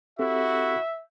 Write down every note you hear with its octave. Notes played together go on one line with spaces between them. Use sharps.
C4 E4 F#4 G4 A4 E5